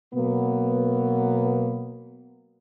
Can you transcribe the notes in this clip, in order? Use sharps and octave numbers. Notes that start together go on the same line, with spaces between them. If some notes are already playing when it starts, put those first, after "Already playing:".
B2 F#3 A#3 B3